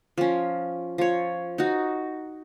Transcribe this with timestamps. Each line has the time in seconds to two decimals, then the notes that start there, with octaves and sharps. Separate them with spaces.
0.18 F3 C#4
0.98 F3 C#5
1.58 D#4 F#4